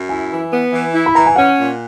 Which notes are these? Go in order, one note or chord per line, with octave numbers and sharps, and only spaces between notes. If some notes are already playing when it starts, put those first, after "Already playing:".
Already playing: F#2
E4 G#5
E3
B3
E3
E4
B5
E3 A#5
G#5
C#4 F#5
A#2